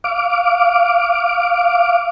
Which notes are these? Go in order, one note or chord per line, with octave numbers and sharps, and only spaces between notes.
F5 D6